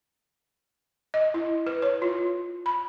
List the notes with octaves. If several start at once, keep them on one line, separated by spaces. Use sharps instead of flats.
D#5
E4
B4
C#5
F4
B5